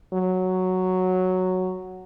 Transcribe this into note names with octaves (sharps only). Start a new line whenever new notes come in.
F#3